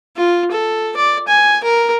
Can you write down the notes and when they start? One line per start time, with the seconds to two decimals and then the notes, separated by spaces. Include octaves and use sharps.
0.17 F4
0.52 A4
0.97 D5
1.28 G#5
1.64 A#4